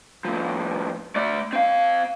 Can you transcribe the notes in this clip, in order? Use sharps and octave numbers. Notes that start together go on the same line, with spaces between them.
A2 F3
A3 D5
C4 F5